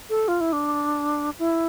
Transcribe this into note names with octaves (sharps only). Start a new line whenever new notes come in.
A4
F4
E4
D4
E4